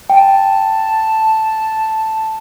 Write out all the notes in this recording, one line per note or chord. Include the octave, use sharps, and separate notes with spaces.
G5 A5